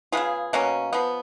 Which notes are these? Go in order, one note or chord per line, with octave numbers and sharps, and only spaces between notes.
C#3 G#3 B3 F4 G#4
B2 F#3 A#3 C#4
F3 B3